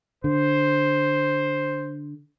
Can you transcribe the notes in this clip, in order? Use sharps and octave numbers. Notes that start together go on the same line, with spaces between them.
D3 C5